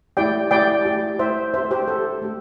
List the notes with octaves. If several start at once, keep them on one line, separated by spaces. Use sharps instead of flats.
A3 E4 G4 D5 G5
A3 E4 G4 D5 G5
A3 E4 G4
A3 E4 G4 C5 E5
A3 D4 G4 C5 E5
G4 C5
A3 D4 G4 A4
A3 D4 G4